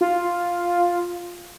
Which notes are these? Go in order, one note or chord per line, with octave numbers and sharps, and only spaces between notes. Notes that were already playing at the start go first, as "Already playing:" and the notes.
F4